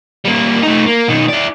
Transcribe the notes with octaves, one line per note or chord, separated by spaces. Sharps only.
G3 A#3
A3 D#4
A#3
B2 D#3
E4 D5